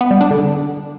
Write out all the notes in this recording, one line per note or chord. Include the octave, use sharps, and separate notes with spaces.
B3
G3
D4
D3